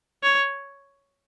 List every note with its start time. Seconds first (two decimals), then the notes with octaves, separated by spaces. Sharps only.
0.23 C#5